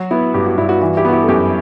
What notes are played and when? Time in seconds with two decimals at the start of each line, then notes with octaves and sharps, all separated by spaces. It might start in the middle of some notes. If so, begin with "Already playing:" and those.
Already playing: F#3 F#4
0.11 B3 E4
0.34 G2 G4
0.46 F#4
0.58 G2 E4
0.69 F#4
0.81 E3 F#4
0.97 E4 G4
1.05 B3 F#4
1.13 E4 G4
1.23 A4
1.28 F#2 E4 G4